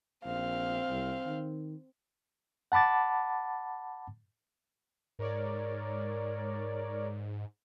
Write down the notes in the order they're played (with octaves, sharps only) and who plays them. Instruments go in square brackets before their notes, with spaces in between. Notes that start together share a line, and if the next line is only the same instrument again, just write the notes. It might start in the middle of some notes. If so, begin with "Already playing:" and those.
[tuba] A#1 [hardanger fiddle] C4 [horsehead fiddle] F5
[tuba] C2
D#3
[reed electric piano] F#5 A5 B5 D6 A6
[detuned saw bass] G#2 [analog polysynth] A#4 C#5 D5